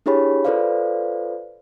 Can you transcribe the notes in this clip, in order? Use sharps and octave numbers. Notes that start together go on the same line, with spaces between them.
D4 E4 G4 G#4 C#5 B5
F4 A4 B4 C5 D5 F5